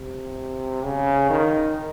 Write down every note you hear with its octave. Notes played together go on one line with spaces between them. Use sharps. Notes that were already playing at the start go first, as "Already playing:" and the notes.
Already playing: C3
C#3
D#3